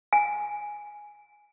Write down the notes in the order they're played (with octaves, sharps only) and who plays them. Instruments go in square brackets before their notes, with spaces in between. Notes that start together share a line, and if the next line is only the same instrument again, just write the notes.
[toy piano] G#5